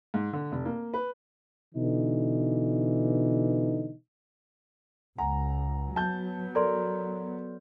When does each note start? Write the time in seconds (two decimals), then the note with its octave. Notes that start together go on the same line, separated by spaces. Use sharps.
0.14 G#2
0.33 D3
0.52 F1
0.65 A#3
0.94 B4
1.75 B2 D3 E3 D#4
5.18 C#2 F#5 G#5 A#5
5.96 F#3 B3 A5 G6
6.55 A4 A#4 D5 C6